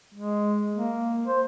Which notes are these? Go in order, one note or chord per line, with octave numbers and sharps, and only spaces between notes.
G#3
A#3
C5